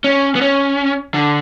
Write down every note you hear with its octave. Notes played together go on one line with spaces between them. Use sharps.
C#4
B3
C#4
D3